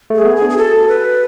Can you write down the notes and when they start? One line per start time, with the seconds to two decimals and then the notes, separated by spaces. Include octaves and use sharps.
0.10 A3
0.15 G#4
0.25 B3
0.36 G#4
0.42 D4
0.50 G#4
0.57 F#4 A4
0.88 B4